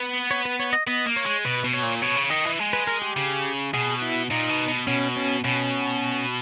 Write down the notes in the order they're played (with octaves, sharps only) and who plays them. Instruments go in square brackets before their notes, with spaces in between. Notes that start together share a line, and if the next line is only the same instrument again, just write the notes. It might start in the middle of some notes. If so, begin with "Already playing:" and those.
Already playing: [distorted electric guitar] B3
[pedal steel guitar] C#5
B4
C#5
D#5
[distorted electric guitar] B3 [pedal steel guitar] D#5
[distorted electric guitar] A#3
[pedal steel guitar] C#5
[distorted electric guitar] G#3
[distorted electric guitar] B2 [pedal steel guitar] B4
[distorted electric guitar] B2
[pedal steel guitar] C#5
[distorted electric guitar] A#2
[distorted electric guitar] B2 [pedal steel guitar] C#5
[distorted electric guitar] C#3
[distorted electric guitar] D#3 [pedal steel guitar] D#5
[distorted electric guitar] E3
G#3
[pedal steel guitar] B4
A#4
G4
[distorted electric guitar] C#3
[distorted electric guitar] B2 [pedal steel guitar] G#4
[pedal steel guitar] E4
[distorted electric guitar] A#2 [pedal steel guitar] D#4
[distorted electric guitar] B2
B2
[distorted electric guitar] B2 [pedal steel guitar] C#4
[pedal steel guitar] C#4
[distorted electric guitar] B2 [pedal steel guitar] C#4